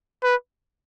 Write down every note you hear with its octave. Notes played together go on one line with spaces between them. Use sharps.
B4